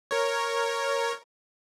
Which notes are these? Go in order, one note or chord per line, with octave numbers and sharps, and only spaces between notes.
A#4 C#5